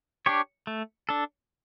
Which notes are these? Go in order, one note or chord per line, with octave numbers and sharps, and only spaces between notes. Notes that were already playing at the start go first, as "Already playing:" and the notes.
D4 G4 C#5
A3
D4 A4